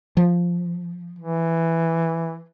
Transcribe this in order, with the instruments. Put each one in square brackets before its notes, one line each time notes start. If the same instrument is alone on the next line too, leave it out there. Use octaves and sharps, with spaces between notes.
[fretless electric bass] F3
[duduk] E3